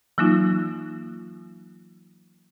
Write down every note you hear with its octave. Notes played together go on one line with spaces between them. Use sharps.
E3 F#3 A#3 D#4 F4